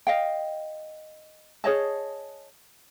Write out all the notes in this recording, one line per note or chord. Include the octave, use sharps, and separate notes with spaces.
D#5 F5 G5
G#4 C#5 D#5 A5